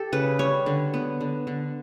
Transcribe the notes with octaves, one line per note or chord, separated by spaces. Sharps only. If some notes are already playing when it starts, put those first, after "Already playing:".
Already playing: G4 A4
C#3 B4
G3 C#5
D3
B3
D3
D3